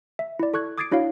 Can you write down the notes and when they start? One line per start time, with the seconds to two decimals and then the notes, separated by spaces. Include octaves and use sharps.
0.19 E5
0.39 E4 D5
0.54 A4 C#6 F#6 G#6
0.78 D6 D#6 G#6 A6 C7 D7
0.92 D4 E4 F#4 C#5 F5